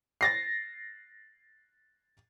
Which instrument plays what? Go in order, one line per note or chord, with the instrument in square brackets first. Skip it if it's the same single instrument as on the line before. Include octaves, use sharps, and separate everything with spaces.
[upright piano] A6 A#6 C7